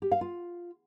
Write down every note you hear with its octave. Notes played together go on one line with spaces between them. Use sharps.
G4
F5
F4